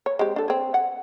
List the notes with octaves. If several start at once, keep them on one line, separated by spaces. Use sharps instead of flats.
C#5
G#3 C4 G4
D4 A4
C4 G#4
F#5